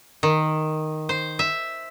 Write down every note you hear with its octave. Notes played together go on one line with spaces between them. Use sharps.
D#3
C5
E5